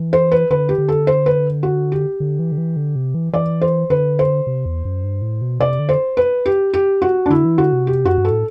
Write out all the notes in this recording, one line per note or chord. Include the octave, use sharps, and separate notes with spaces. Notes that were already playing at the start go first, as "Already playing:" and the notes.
Already playing: E3
C5
B4
D3 B4
G4
D3
A4
C5
B4
F#4
G4
D3
E3
D3
E3
D3
C3
E3
E3 D5
C5
D3 B4
C5
C3
E2
F#2
G2
A2
B2
C3 D5
D3
C5
B4
G4
G4
F#4
D4
D3 E4
E3
D3 F#4
C3
G4
F#2 F#4
G2
A4
A2